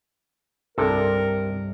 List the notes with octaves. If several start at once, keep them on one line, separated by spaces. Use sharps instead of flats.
C2 G2 C3 G3 A4 A#4